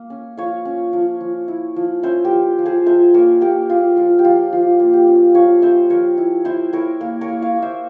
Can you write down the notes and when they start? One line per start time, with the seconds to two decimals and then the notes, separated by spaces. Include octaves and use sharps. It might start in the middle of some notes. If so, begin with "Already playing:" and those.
Already playing: A#3
0.10 C#4
0.38 F3 C#5 F5
0.65 C#4
0.93 F3
1.21 F3
1.48 E4
1.76 F3
2.03 C#4 C5 E5
2.25 G4 A#4
2.31 F3
2.59 F3
2.66 G#4 C5
2.86 F3 C5 E5
3.14 A#3 A#4 C#5
3.41 A#3 G4 A#4
3.69 A#3 F4 G#4
3.96 F3 F4
4.19 G4
4.24 F3 F4
4.53 F3 F4
4.79 A#3
4.93 G4
5.07 C#4
5.35 F3 C#5 F5
5.62 C#4 C5 E5
5.90 F3 A#4 C#5
6.18 E4
6.45 E4 C5 E5
6.73 E4 A#4 C#5
7.01 A#3
7.21 A#4 C#5
7.28 A#3
7.42 C#5 F5
7.56 A#3
7.62 C5 E5